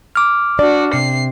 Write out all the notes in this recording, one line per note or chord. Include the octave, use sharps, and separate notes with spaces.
D6 F6
D4 F#4 D5
C3 C7